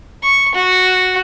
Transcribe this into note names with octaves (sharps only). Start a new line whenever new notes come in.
C#6
F#4